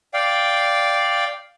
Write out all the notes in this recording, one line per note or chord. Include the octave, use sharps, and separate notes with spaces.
D5 F5 G5